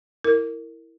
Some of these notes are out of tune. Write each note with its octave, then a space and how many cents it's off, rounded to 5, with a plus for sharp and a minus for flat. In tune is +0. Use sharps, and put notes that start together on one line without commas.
E4 +0 A#4 -20